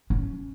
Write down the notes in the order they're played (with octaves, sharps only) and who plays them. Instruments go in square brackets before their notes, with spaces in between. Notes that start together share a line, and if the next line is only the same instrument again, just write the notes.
[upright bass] C#4